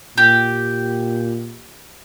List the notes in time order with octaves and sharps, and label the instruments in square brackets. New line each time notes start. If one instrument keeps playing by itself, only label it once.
[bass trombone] A#2 [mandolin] G4